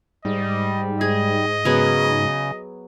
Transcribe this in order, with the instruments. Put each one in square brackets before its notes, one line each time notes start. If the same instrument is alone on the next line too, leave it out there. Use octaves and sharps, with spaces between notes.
[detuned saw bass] G#2 [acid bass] G3 [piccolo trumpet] D#5
[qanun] G#4 [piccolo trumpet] D#5
[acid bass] C#3 [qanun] F#3 B3 G#4